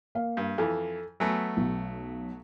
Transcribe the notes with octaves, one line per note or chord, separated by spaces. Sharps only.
A#3 F5
G2
F2 E3 A4
F#3 A3 B3 G#5
B1